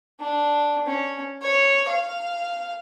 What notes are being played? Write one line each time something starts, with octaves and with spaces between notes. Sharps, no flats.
D4
C#4
C#5
F5